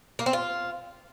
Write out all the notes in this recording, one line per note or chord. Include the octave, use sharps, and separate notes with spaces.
A#3
C4
F4